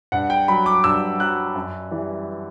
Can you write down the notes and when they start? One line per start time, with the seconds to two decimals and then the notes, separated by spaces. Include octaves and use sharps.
0.12 G2 F#5
0.30 G5
0.48 F#3 B5
0.66 D6
0.84 G2 E6
1.20 F#3 F#6
1.56 F#2
1.91 E3 G3